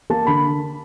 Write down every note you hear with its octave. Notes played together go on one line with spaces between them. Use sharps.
A#3 A5
D3 B5